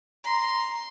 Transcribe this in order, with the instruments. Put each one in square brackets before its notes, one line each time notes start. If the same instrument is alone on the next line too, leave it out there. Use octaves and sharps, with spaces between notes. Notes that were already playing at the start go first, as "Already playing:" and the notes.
[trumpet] A#5 [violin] C6